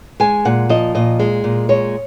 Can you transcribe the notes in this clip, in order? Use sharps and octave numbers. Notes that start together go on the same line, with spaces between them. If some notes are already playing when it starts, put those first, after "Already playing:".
G#3 G#5
A#2 F#5
F3 D#5
A#2 D#5
G#3
A#2
G#3 C#5